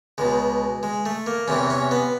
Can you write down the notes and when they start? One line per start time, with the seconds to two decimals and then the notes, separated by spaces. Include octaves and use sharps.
0.18 C#2 B2 G#3
0.83 G#3
1.06 A3
1.27 A#3
1.48 E2 C3 E3 C#4
1.70 C#4
1.91 B3